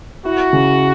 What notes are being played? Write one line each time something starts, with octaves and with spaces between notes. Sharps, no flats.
E4 F#4
C#3